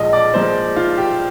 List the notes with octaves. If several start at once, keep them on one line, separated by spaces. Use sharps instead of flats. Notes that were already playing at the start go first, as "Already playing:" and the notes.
Already playing: A#1 A#2 F3 G#3 D#5
D5
A#1 A#2 F3 G#3 C5
F4
G4